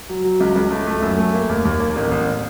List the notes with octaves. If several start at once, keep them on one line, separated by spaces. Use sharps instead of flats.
F#3
F#3
C#2
C#2
A3
A3
F#2
A3
A#3
D#2
D#2
A#3
A1
A1